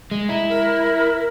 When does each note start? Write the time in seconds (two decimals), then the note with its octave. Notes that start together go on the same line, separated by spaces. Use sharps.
0.11 G#3
0.29 E4 A#5
0.49 A#4